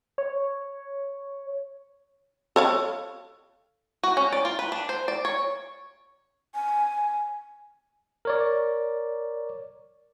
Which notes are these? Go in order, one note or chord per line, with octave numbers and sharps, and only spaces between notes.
C#5
A4 C#5 F5
F#4
C#4
D5
F4
B4
D4
C5
D5
C#5
G#5
A#4 C#5 D5